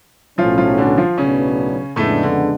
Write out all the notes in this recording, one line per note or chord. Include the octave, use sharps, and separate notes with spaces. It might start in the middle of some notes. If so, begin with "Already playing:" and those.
B1 A2 F3 F#3 C#4 F4
F3 F4
D3 D4
F3 F4
B1 A2 C#3 F#3 B3 C#4 D4
F2 A2 C#3 G#3 A3 B3 D4
D3